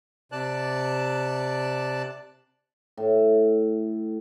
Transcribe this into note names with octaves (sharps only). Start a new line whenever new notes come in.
C3 D5 A5 F#6
A2